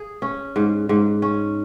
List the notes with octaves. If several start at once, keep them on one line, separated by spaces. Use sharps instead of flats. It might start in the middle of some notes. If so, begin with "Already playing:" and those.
Already playing: G#4
C#4
G#2
G#2
C#4